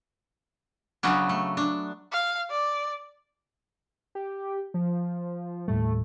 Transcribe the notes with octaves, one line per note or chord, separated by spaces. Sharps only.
C#3 F#3 B3 C#4 D4
A3
D4
F5
D5
G4
F3
D#2 A2 G3 A3